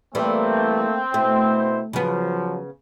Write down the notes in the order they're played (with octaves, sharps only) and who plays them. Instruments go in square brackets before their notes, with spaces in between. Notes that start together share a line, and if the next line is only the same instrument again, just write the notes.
[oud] E3 G3 [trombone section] A3 A#3 [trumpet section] C4
[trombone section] B2 E4 C5 [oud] A3
[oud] C#3 B3 [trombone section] F3 F#3